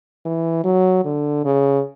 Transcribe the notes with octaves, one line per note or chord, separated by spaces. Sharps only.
E3
F#3
D3
C#3